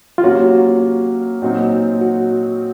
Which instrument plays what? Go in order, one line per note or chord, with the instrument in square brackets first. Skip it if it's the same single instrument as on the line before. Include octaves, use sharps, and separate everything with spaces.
[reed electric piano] F4
[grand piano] C3 F#3 A#3 C#4 [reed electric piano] F#4
[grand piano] A#2 F#3 C4 D#4
[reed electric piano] F#4